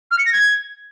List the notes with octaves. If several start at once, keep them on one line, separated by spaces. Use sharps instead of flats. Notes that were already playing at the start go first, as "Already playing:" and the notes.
F6
C#7
A#6
G#6